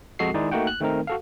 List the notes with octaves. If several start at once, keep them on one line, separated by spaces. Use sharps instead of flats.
F2 G#3 F#4 A4 D#5 C7
D#3 G#3 D#4 E4 G#4 D5
A3 A#3 D#4 F#4 F#5 G5
F#6
D#3 A3 C4 D#4 A#4
F#4 A4 F5